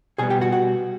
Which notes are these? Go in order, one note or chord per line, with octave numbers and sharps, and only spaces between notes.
B2 G3 B3 G#4 G#5
G4 G5
F#4 F#5
F#4 F#5